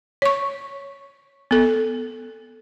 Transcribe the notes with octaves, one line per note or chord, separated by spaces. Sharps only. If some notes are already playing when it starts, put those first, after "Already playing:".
C#5 C#6
B3 A4